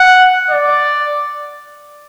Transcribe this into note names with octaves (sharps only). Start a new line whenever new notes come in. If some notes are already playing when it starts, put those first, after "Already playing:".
Already playing: F#5
D5